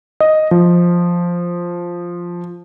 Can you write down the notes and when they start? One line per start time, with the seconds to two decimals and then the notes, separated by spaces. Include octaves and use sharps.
0.20 D#5
0.51 F3